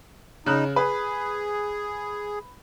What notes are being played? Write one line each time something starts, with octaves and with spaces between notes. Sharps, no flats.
C#3 D#4 F#6
G#4 B4